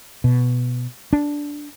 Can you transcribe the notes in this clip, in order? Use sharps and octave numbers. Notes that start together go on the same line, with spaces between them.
B2
D4